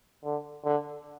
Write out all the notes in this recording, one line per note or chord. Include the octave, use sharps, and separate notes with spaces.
D3
D3